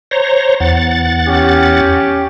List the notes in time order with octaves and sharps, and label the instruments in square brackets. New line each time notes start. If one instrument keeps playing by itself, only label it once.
[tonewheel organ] C5 C#5 A#5
E2 F#5 A6
[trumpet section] C#4 G4